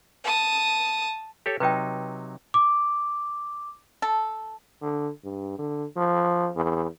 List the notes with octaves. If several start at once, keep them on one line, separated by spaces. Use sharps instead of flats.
A5 D#6
G4 A4 C#5
C3 F#3 D#4 B4 G5
D6
A4
D3
G2
D3
F3
E2